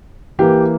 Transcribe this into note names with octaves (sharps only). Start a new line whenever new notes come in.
E3 A#3 G4